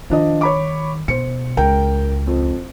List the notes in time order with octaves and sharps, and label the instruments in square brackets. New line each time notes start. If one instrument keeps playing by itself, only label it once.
[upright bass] D#3 [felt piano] F3 D4 D#5
[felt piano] C#5 B5 D6
[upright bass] B2 [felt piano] C5 C#7
[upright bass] C#2 [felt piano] A#4 G5
[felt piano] F2